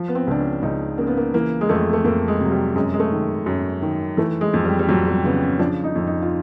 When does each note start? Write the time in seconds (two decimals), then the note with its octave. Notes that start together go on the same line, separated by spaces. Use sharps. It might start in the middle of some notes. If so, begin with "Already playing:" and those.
Already playing: F3
0.08 B3
0.15 C4
0.27 C#2 D4
0.39 C#4
0.62 C#2 D#4
0.98 C#3 A#3
1.07 B3
1.17 A#3
1.34 E3 A#3
1.61 G#3
1.69 F2 A3
1.93 A3
2.04 F2 A#3
2.28 G#3
2.41 C3 F#3
2.52 G3
2.76 F#2 G#3
2.94 G#3
2.99 A3
3.12 D#3
3.46 F#2
3.82 D#3
4.17 E3 A3
4.41 G#3
4.53 F2
4.65 G3
4.79 G3
4.89 F2 F#3
5.07 G3
5.24 C#3 B3
5.43 C#4
5.59 F3 D4
5.84 D#4
5.95 F2
6.07 D#4
6.22 F4